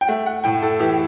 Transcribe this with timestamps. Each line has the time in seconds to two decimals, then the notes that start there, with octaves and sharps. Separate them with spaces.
0.01 G5
0.08 A3 F#5
0.26 F#5
0.44 A2 G5
0.62 A4
0.80 E3 G4